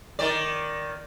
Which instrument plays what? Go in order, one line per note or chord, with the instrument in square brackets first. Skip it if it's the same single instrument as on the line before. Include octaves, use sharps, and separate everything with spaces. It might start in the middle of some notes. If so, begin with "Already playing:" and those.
[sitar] D#3 D5